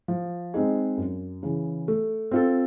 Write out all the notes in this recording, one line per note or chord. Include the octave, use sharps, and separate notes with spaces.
F3
G#3 C4 D#4 G#4
F#2
C#3 E3
A3
C4 F4 A4